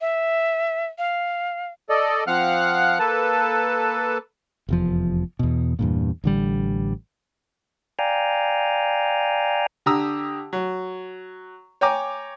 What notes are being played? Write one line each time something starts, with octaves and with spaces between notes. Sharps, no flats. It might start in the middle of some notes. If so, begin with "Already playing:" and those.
E5
F5
A4 D5 D#5
F3 C4 F5 F#5 F6 F#6
A#3 A4 B4 A5
F1 E2 F3
E2 B2
E2 G2 A#2
A1 D3 G3
D5 F5 G5 G#5 A#5
D3 G4 A#5 D#6 E6
F#3
C#5 G5 G#5 A#5 D6